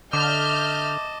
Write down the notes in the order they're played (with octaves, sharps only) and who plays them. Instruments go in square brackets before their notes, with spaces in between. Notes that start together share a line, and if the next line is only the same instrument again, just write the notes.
[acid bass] D3 [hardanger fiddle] D#5 A5 [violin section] E5 F6 G6 [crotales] D6